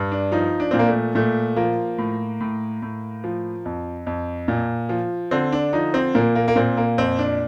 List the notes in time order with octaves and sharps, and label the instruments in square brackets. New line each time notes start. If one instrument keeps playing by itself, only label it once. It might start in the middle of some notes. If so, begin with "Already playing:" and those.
Already playing: [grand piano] G2
D4
F3 D#4
D4
A#2 C4
A#3
A3
A#2 A3
F3 A#3
A2
A2
A2
F3
F2
F2
A#2
F3
D3 C4
D4
F3 D#4
C4
A#2 A#3
A#3
A#3
A#2 C4
A#3
F2 C4
D4